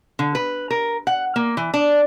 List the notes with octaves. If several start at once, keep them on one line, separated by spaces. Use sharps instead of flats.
D3
B4
A#4
F#5
A#3
E3
D4